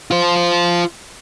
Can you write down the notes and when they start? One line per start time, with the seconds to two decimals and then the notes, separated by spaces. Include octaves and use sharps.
0.11 F4 C5